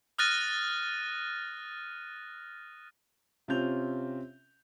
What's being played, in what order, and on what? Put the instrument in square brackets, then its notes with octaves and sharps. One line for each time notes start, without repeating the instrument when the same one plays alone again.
[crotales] D#6 F6 F#6 A6 A#6 D#7
[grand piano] C3 C4 C#4 F4 G6 F7